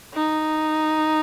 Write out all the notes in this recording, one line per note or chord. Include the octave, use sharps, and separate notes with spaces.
D#4